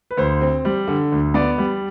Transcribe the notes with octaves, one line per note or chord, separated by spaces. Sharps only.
B4
D2 C5
C4
G3
D3
D2
B3 D5
G3